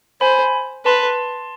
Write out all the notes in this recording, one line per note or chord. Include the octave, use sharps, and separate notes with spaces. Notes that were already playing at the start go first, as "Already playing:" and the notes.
C5 G#5 B5
B4 A5 C6